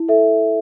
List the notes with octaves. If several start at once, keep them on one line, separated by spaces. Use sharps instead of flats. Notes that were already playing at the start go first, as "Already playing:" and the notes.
Already playing: E4
A4 E5